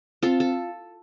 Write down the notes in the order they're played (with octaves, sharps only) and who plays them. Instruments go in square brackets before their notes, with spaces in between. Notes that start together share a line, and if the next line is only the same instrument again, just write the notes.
[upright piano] C4 [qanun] F4 A4
[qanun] A4